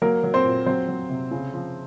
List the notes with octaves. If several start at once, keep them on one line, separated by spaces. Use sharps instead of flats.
F#3 A#3 A#4
F#3
C4 C5
A#2
F#3 C4 C5
F#3
C3
C#3
F3